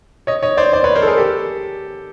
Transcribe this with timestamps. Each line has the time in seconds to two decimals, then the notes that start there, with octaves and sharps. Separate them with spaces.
0.27 C#5 D#5
0.43 C#5 D#5
0.57 C5 D5
0.73 C5 D5
0.84 B4 C#5
0.95 A#4 C5
1.02 A4
1.07 G#4 A#4
1.17 G4 A4